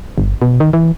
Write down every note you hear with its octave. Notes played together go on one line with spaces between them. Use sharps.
G1
B2
D#3
E3